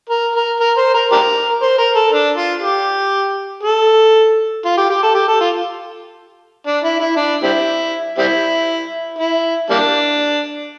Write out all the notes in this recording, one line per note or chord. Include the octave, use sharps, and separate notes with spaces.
A#4
A#4
A#4
C5
A#4
D4 G4 A#4
C5
A#4
A4
D4
F4
G4
A4
F4
G4
G4
A4
G4
A4
F4
D4
E4
E4
D4
G3 C4 E4
G3 C4 E4
E4
G3 A#3 D4